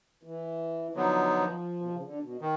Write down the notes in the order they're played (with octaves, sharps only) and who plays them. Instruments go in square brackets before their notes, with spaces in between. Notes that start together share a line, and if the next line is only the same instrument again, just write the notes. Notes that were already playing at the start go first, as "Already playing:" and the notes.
[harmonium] E3
[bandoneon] D3 F#3 B3 D#4 [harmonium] F3
[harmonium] F3
B2
C3
C#3
D3
B2
[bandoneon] D#3